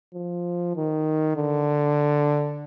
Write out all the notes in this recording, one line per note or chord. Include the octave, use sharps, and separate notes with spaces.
F3
D#3
D3